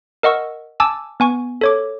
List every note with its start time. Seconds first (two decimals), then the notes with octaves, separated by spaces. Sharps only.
0.23 A#4 D#5 F#5 C#6 E6
0.80 G#5 A5 D6 E6
1.20 B3 G#5 C#6
1.61 A4 C#5 D6